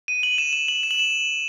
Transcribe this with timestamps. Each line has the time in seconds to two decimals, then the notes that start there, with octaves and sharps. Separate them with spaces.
0.08 D#7
0.23 F#7
0.38 E7
0.53 E7
0.68 F#7
0.83 E7
0.91 F#7
1.00 E7